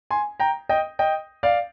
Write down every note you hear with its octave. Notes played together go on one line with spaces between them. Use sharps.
G#5 C6
G5 A#5
D#5 G5
D#5 G5
D5 F5